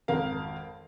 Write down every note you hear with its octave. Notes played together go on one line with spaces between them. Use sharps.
G#1 F2 A#4 F5